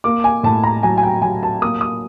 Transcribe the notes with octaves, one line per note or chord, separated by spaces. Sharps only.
A#3 D6
G#5
A2 A5
A#5
F#3 G#5
G#5
G5
F#3 G#5
A5
A#3 D#6
D#6